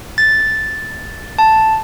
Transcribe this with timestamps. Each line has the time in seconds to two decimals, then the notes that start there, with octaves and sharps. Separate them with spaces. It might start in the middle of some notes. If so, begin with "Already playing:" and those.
0.18 A6
1.39 A5